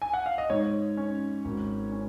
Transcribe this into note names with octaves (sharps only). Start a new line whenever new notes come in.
G#5
F#5
F5
D#5
G#2 C#5
C#4
G#1
C#4